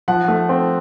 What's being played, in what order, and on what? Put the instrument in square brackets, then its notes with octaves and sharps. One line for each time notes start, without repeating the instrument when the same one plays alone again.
[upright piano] F3 F#5
A3
C4